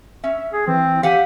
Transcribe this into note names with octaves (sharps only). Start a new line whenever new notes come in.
C#4 E5
G#4
E3 C4
G4 F5 F#5 G#5 B6